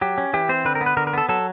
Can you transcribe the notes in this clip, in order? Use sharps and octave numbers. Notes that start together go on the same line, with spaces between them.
F#3 G4
C#4
E3 G4
C4 C5
D3 B4
A#4
B3
B4
D3 A#4
A#4
B3 A4
F#3 A4